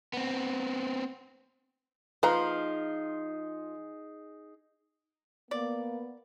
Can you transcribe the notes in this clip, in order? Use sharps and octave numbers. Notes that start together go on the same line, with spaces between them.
B3 C4
F3 D#4 F4 G#4 B4 D#5 A#5
A#3 B3 D5